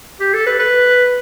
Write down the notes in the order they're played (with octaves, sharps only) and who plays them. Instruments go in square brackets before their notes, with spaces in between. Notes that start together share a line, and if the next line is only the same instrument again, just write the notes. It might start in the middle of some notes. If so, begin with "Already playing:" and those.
[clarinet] G4
A4
B4
B4